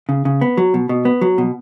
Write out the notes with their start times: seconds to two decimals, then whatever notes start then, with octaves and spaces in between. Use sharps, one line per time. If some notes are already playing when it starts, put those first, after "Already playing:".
0.09 C#3
0.25 C#3
0.41 B3
0.57 F#3
0.74 B2
0.89 B2
1.05 B3
1.21 F#3
1.38 B2